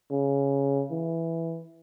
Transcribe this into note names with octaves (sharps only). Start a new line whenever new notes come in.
C#3
E3